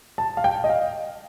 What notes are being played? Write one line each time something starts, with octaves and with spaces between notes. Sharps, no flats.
A5
F5
G5
D#5
F5